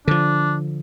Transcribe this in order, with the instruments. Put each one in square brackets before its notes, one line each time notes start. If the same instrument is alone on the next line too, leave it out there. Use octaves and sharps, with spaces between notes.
[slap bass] D3 F3 [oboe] D4